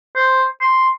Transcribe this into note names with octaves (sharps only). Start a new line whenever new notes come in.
C5
C6